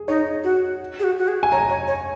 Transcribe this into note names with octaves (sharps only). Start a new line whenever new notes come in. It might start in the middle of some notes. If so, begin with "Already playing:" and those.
Already playing: G#4
D#4 C#5
F#4
G#4
F#4
F#4
G#4
G#5
C#5 A#5
C#5
C#5